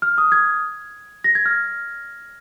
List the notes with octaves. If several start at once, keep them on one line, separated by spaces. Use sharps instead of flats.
F6
D#6
G#6
A#6
G#6
F6